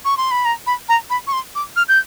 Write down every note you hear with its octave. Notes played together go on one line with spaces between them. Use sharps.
C#6
C6
B5
A#5
B5
A#5
B5
C#6
C6
D6
F6
G6